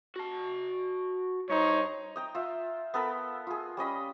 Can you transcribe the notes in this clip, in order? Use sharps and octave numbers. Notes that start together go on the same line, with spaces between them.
F#4 A5
G2 D#4 C5 C#5
D#5 G5 A#5
F4 E5
B3 A4 A#4 B5
F4 G#4
G3 C#4 D#5 B5